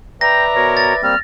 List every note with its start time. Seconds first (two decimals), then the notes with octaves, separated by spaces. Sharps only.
0.21 B4 D5 E5 G5 A#5 A#6
0.56 B2 A#4 C#5
0.77 A6
1.03 G3 A#3 C4 F6